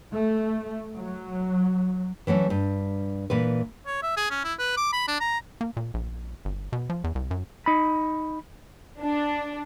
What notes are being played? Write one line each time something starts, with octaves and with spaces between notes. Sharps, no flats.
A3
F#3
E3 F#3 A3 C#4
G2
A#2 E3 B4
C#5
E5
G#4
C#4
E4
B4
D6
B5
D4
A#5
A#3
A#2
A#1
G1
B2
F3
E2
C2
F#2
D#4 B5
D4